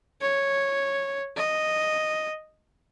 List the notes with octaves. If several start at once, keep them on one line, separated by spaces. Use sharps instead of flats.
C#5
D#5